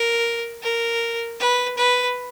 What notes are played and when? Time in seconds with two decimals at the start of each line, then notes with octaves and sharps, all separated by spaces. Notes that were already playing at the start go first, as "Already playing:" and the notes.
Already playing: A#4
0.63 A#4
1.40 B4
1.77 B4